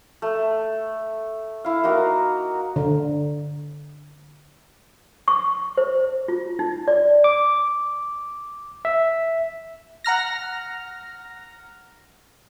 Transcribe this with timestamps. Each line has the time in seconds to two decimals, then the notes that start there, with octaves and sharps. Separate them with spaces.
0.22 A3
1.64 E4 F5
1.84 A#3 D#4 F#4 A#5
2.76 D3
5.28 C#6
5.78 C5
6.28 F4
6.59 D#4
6.88 D5
7.24 D6
8.85 E5
10.04 F#5 A#5 F6 A#6